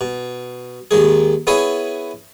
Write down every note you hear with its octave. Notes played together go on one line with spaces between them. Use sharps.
B2
D#2 D#3 G#3 G#4
B3 E4 G#4 C#5 E5 G#5